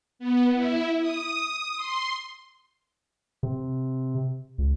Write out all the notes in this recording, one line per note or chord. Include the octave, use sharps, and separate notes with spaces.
B3
E4
D#6
C6
C3
C#2